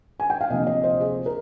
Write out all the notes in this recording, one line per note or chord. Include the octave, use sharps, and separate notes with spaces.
G#5
G5
F5
D2 C3 F3 A#3 D#5
D#5
C5
G#4
A#4